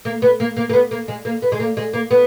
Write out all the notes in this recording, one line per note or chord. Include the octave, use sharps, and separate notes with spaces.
A#3
B3
A#3
A#3
A#3
B3
A#3
G#3
A#3
B3
G#3
A#3
G#3
A#3
B3